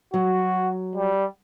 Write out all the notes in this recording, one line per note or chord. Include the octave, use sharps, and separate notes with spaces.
F#3 F#4
G3